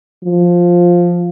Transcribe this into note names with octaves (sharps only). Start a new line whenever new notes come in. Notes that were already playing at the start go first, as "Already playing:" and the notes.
F3